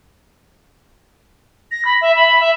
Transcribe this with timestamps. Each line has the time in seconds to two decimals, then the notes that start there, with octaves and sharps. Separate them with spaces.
1.71 A#6
1.85 B5
2.01 E5
2.16 B5
2.40 E5